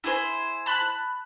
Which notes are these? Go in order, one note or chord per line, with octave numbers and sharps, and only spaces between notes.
E4 G#4 C5
A5 B5 F#6